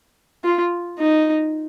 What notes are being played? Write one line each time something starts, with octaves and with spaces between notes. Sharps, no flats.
F4
D#4